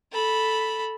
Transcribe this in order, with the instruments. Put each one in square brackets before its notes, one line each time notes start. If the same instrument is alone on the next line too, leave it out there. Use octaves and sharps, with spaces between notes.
[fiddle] A4 B5